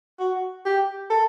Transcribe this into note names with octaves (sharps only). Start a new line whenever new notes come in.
F#4
G4
A4